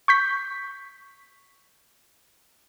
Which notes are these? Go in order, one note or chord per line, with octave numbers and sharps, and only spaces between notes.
C#6 G6 B6